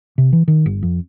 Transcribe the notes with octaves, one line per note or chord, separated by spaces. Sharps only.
C3
E3
D#3
G1
F2